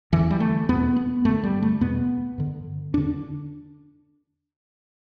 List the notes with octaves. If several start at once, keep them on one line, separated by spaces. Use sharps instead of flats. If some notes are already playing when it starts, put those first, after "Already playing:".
E2 D3 E3
G3
A3
E2 B2 B3
B3
G2 D3 A3
G3
A3
E2 B2 B3
G2 D3
E2 D3 D4